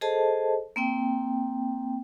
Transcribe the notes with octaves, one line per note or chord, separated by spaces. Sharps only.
G#4 A4 C5 D#5 A5
A#3 C4 G5